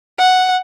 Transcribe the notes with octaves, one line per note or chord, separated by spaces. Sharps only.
F#5